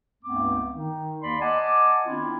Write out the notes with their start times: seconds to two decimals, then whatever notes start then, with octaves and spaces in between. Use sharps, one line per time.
0.23 C#2 G2 A3 B3 C4 D6
0.72 D#3 D#4
1.21 D#2 A#3 D5 B5 C6
1.40 D5 D#5 F#5 G#5 A5 D6
2.05 D#3 B3 C4 D4 E4 F4